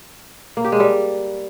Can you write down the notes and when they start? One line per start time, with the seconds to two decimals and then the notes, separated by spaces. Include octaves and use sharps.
0.57 A#3
0.65 G4
0.72 G#3
0.80 G3